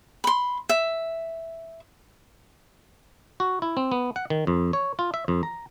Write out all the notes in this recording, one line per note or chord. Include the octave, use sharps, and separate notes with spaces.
B5 C6
E5
F#4
E4
C4
B3
F#5
D#3
F2
C#5
F4
E5
F2
A#5